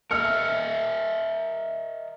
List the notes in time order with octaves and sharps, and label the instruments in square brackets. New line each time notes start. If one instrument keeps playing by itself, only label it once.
[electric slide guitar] A#4 D#5 E5 [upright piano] E6 F6 C#7